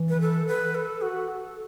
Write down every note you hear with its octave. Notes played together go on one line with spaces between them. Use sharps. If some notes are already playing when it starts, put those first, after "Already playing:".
Already playing: E3
B4
A4
B4
A4
F#4
A4